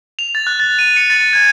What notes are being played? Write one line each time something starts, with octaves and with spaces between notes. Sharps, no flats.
F7
A6
F#6
A6
D#7
C#7
A6
G#6